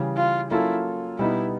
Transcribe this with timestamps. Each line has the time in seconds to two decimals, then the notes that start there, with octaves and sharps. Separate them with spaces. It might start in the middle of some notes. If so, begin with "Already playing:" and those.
Already playing: C#3 E3 G3
0.17 F4
0.51 F#3 A#3 C#4 E4 F4 A4
1.19 B2 G3 B3 D#4 E4